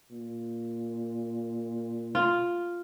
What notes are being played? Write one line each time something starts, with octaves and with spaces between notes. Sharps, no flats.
A#2
F4